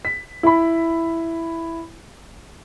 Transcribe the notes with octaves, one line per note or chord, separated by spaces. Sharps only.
B6
E4 B5